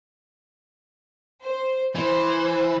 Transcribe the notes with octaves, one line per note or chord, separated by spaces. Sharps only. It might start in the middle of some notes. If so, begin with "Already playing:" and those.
C5
E3 C5